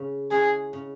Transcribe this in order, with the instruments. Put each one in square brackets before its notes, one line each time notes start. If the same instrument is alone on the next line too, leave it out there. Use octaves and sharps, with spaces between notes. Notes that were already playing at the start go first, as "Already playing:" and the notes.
Already playing: [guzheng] C#3
[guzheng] G#3 C#4 E4 [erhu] G#4
[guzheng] C#3